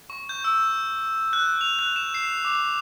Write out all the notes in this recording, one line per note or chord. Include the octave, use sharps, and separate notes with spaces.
C#6
G6
E6
F#6
F7
F#6
E7
C7
D6